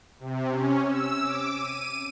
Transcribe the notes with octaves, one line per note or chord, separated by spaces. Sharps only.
C3
C#4
E6
D6
D#7